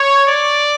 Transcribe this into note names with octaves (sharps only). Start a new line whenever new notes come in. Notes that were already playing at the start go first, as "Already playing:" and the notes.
Already playing: C#5
D5